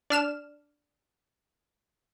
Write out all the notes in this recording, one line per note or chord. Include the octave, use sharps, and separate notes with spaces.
D4 F6 E7